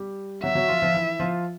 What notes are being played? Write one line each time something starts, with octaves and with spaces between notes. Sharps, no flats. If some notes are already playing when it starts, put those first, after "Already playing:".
Already playing: G3 G4
F#3 F#4 E5
F#3 F#4
F3 F4
F3 F4
E3 E4
F3 F4